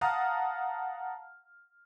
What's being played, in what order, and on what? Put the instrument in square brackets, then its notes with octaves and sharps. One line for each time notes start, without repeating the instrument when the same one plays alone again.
[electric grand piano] F5 F#5 A5 A#5 D#6 F6